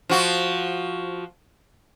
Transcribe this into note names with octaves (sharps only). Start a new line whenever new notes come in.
F3 F#4